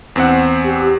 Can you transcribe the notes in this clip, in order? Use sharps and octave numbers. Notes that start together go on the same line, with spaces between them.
E2 C4 F#5
G4